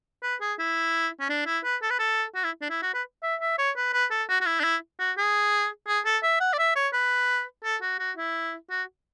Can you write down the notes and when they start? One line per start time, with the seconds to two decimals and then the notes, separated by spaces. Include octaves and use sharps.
0.23 B4
0.41 G#4
0.59 E4
1.20 C#4
1.29 D4
1.46 E4
1.64 B4
1.82 A4
1.90 B4
1.99 A4
2.35 F#4
2.44 E4
2.61 D4
2.70 E4
2.82 F#4
2.94 B4
3.23 E5
3.41 E5
3.58 C#5
3.76 B4
3.93 B4
4.11 A4
4.29 F#4
4.41 F#4
4.46 E4
4.60 D4
4.64 E4
4.99 F#4
5.18 G#4
5.88 G#4
6.05 A4
6.23 E5
6.40 F#5
6.53 D5
6.58 E5
6.76 C#5
6.93 B4
7.64 A4
7.82 F#4
7.99 F#4
8.17 E4
8.70 F#4